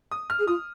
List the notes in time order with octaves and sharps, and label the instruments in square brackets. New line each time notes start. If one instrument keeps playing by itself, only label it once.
[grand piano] D#6
F6
[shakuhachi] G#4
[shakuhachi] F4 [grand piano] D#6